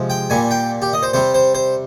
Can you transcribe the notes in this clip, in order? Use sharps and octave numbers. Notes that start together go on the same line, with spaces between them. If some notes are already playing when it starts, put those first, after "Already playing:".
Already playing: C3 F3 G#3
G5
A#2 G3 G#5
G5
G4
D#5
C5
C3 G3 C5
C5
C5